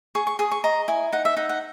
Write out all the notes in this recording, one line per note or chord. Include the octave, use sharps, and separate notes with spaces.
G#4 C#6
C#6
G#4 D#6
C#6
D#5 A#5
E4 G#5
D#4 F#5
E5
D#4 F#5
F#5